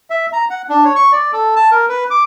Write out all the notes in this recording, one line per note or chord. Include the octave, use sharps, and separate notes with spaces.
E5
A#5
F#5
D4
C#5
C#6
D5
A4
A5
A#4
B4
D6